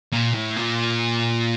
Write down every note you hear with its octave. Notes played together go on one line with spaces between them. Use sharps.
A#2
A2
A#2